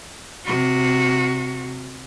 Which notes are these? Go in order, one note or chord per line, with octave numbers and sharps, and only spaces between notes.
C3 F#4